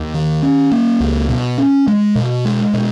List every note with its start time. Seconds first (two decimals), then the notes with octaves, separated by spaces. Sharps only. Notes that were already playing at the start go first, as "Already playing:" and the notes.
Already playing: D#2
0.14 D#3
0.43 C#4
0.72 A#3
1.00 C#2
1.29 B2
1.58 C#4
1.88 G#3
2.15 B2
2.45 G#3
2.74 B2